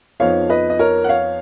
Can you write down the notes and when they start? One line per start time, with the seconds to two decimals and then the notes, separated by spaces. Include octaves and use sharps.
0.20 F2 F3 B3 D#4 C#5 F5
0.50 B4 D#5
0.70 D#5
0.79 A#4 C#5
1.04 F#5
1.09 C#5 F5